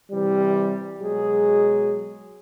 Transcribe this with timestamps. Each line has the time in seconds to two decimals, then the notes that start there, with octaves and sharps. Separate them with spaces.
0.12 C3 E3 G3
1.01 B2 F#3 G#3 G#4